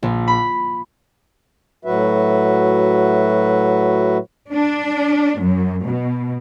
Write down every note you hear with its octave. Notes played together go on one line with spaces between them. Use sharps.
A#1
B5
A2 F#3 F#4 B4 E5
D4
F#2
B2